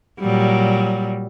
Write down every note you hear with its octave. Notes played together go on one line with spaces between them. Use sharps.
A#2 F#3 G3